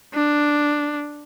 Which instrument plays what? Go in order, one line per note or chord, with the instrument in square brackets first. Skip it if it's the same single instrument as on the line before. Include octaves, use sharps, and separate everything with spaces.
[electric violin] D4